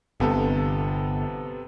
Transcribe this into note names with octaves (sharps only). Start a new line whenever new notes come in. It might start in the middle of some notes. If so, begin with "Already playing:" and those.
G1 C3 B3 A4